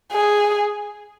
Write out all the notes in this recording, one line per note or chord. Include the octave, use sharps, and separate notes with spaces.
G#4